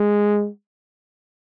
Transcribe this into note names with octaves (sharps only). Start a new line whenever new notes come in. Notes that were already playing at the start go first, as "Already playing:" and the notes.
Already playing: G#3